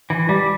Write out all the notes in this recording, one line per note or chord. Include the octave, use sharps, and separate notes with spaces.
E3
G3